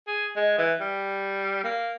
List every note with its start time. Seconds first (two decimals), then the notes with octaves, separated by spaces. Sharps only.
0.07 G#4
0.36 G#3
0.58 E3
0.80 G3
1.64 A#3